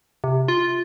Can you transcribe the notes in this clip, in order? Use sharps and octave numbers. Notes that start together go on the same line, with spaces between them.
C3
F4